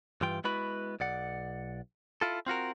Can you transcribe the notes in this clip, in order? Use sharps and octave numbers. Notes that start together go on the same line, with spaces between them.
G2 E3 F4 G5
G#3 B3 E4 F#4 B4 B5
B1 D5 F#5
E4 F4 A4
C4 F4 F#4 A#4